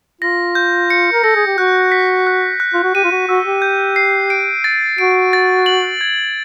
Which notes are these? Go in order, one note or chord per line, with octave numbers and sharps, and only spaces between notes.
F4 A#6
G6
C#7
A#4
A4 A#6
G#4
G4
F#4 F#6
B6
F#6
F#6
F4
F#4
G4 D#7
F4
F#4
F#4 E6
G4
G6
C7
D7
A6
F#4 D7
A6
F#7
G#6